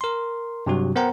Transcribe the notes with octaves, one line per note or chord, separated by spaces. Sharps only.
A#4 C6
G2 C3 F#3 F#4
B3 A#4 C5 F#5 G5 A#5